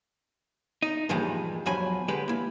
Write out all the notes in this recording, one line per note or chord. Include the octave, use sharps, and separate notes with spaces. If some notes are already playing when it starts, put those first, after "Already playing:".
D#4
G2 A#2 E3 F3 G3 G#3
E2 F3 F#3 G#5 B5
D3 G#3 G4 B4 B5
A#3 E4